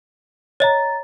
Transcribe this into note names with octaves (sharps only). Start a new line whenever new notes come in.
C#5 D#5 A#5 A6